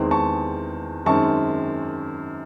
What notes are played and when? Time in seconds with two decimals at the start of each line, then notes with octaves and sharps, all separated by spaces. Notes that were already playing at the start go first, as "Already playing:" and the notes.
Already playing: E2 D#3 G#3 C4
0.11 A5 C#6
1.06 F#2 D#3 G#3 C4 A5 C#6